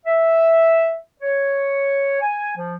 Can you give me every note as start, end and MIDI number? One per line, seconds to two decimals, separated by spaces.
0.06 0.96 76
1.20 2.16 73
2.20 2.55 80
2.56 2.76 53